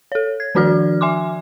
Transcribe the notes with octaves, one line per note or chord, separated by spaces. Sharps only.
A4 C#5
G#6
D#3 F3 D4 F#4 D5 F6
E5 G#5 C6 D6